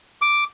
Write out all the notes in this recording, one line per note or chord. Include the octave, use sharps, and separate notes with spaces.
D6